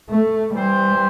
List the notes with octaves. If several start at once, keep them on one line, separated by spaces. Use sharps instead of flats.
A3
E3 G3 C4 G4 C5